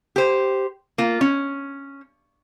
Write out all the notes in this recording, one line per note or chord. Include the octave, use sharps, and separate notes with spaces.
G4 C5
A#3 F4
C#4